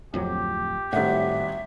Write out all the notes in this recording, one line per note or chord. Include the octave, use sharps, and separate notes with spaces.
D1 F2 F#3 G4
G#1 A2 G3 E5 F#5